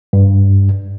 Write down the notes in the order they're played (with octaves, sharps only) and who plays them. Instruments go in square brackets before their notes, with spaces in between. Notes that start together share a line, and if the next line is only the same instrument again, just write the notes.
[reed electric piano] G2